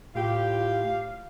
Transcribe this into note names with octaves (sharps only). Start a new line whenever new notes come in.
A2 F4 G4 F5